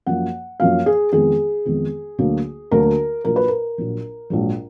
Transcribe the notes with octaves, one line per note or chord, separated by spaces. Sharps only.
F#2 F3 A#3 F#5
F#2 F3 A#3 F5
G#4
F2 D#3 G#3 B3 G#4
F2 D#3 G#3 B3
D2 D3 F#3 A#3
D2 D3 F#3 A#3 A#4
A#1 A#2 F#3 A#4
B4
A#4
A#1 A#2 F#3
A#1 G#2 F#3